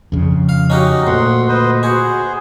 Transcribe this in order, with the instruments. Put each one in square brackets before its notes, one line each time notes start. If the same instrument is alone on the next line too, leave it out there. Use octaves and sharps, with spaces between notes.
[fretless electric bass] F2 C#3
[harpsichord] F5
[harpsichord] C#4 F#4 G4 [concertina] D#4 D#5
[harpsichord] D2 [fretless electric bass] A#2 [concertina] F#5 C6
[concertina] B4 C5 D#5
[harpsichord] F#4 [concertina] G#4 C5